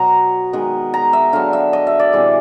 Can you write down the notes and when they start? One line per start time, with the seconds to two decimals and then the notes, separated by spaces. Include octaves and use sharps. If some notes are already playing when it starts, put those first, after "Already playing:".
Already playing: B2 F#3 B3 A#5
0.53 D#3 G#3 B3
0.94 A#5
1.13 E5
1.33 D3 F#3 B3 F5
1.53 E5
1.73 D#5
1.87 E5
1.99 D5
2.13 C3 E3 G#3